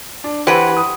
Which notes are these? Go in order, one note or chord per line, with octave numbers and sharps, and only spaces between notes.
D4
E3 G4 B4 C5 F#5
D#6